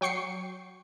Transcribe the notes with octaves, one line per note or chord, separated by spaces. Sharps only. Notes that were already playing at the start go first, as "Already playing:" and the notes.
F#3 G5 C#6 C7 C#7